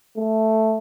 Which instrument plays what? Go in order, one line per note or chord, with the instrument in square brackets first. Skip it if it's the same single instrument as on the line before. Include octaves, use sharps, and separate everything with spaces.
[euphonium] A3